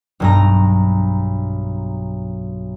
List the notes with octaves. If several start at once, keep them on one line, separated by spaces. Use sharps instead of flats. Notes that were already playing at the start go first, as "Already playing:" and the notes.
B1 G2 A#5